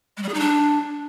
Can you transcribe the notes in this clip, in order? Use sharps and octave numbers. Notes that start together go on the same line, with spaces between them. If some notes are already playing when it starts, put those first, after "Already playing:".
G#3
G3
G#4
D#4
D4